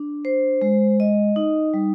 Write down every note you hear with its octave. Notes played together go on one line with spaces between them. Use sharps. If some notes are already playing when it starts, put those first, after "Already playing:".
Already playing: D4
C5
G#3
D#5
D#4
G3